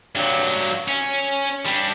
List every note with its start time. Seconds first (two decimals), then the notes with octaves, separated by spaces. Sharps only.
0.15 G2 F#3
0.88 C#4
1.66 G3 D4